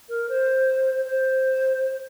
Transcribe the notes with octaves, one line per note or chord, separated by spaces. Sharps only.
A#4
C5
C5